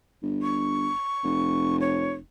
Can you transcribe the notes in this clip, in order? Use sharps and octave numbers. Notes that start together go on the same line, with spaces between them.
G1
C#6
F1
C#5